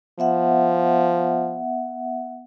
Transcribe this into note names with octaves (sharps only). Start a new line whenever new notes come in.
F3 B3 E5 F#5